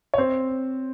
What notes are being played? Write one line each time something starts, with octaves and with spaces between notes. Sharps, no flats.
C#5
C4 C5